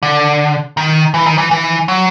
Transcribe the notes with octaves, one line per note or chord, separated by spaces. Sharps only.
D3
D#3
E3
D#3
E3
E3
F#3